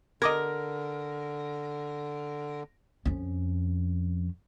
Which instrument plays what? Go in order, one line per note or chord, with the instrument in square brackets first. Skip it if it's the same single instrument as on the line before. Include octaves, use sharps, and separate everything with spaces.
[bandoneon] D3 [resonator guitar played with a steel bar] A#4 [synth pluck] D#5 D6 G#6
[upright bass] F2 C#4